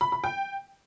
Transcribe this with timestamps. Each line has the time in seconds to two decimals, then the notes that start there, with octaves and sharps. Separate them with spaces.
0.01 B5
0.12 B5
0.24 G5